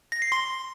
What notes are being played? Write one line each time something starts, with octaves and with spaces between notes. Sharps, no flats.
A#6
C7
C6